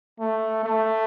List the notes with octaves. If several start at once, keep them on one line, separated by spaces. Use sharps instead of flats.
A3
A3